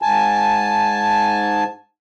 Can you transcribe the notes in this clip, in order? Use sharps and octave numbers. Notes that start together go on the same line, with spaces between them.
G#2 G#5 A5